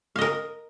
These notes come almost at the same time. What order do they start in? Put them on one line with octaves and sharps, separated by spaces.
F5 D#5 A#4